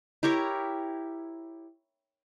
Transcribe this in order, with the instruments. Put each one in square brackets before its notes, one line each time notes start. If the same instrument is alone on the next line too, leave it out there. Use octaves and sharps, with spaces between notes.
[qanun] E4 G4 A#4 C#5